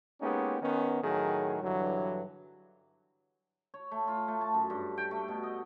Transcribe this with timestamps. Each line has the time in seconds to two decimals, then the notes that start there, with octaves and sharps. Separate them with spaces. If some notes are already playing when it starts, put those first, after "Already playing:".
0.21 G#3 A#3 B3 C#4 D#4 G4
0.62 D#3 B3 C#4
1.03 A2 D#3 F#3 G#4
1.62 G2 D3 E3 F#3
3.74 C#5
3.91 A3
4.07 F4
4.28 A3
4.41 A5
4.54 F#2
4.70 G2
4.98 G5
5.11 A3
5.28 B2
5.43 D#5